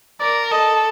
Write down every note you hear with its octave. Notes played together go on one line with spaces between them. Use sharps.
A#4 D5
A4 D#5